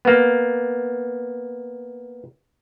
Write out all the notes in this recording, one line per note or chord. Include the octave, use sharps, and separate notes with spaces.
A#3 B3